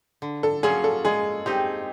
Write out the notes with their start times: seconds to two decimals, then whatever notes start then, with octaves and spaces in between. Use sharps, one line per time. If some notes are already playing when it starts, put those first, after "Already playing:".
0.22 D3
0.43 A4
0.63 F#3 A#3 C#4 F4 G#4
0.84 A4
1.05 G#3 G#4
1.46 C4 D#4 G4